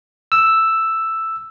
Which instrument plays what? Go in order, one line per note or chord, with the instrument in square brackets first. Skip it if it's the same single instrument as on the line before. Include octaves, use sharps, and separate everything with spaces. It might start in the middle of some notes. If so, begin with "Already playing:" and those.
[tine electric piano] E6